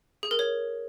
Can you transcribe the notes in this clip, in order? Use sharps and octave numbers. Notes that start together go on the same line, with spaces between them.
G#4
A#4
C#5